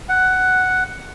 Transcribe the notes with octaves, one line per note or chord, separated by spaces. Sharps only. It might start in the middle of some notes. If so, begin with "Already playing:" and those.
F#5